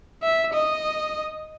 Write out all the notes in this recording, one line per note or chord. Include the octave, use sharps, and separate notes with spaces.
E5
D#5